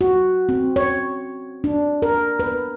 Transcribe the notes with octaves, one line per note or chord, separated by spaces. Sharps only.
F#4
C4
C#5
D4
A#4
B4